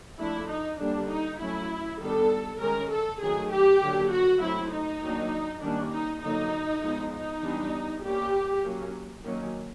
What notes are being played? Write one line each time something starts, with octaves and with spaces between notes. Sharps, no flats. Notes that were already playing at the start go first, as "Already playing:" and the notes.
F3 A3 D4 E4
D#4
D3 G3 A#3 D4
D#4
F#3 A3 C#4 E4
D#3 G3 B3 D4 A4
D#3 G#3 C#4 A#4
A4
D#3 F#3 A3 G#4
G4
D3 F#3 A#3
F#4
F#3 A3 C4 E4
D#4
D#3 F#3 A#3 D4
D#3 G3 A#3 C#4 D4
D#4
D3 F#3 A#3 D#4
F3 G#3 B3
D#4
E3 G3 B3 D4
G3 A#3 C#4 G4
F#3 A#3 C#4
D#3 F#3 A#3 C#4